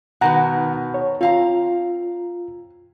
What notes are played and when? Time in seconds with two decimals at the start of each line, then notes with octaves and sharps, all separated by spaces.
0.21 B2 D#3 B3 F#5 A#5
0.94 C#5
1.21 C4 F4 F5 A#5